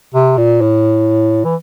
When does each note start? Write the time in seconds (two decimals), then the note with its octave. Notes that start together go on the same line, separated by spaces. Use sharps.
0.14 C3
0.38 A#2
0.61 A2
1.44 E3